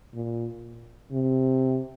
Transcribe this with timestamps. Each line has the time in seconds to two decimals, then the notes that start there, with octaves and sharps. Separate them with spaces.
0.14 A#2
1.12 C3